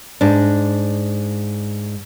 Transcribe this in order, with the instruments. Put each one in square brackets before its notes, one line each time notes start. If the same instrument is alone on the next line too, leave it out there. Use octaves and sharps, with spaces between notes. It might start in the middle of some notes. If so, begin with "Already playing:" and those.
[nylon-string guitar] G#2 D4